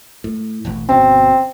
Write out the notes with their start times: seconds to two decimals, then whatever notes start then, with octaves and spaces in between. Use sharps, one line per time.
0.24 A2
0.65 E1 A1 A2
0.89 G1 B2 C4 C#4